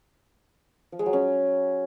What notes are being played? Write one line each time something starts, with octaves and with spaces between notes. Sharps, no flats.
F3
G#3
F#3
C#4